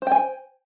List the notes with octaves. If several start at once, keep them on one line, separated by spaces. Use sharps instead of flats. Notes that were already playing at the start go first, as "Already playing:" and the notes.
C5 G5 G#5